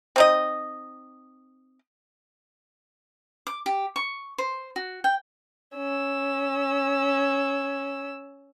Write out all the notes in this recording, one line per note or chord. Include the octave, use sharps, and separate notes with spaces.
C4 D#4 D#5
D6
G4
C#6
C5
F#4
G5
C#4 E6